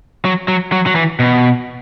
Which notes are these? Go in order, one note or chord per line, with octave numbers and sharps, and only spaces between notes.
F#3
F#3
F#3
F#3
E3
B2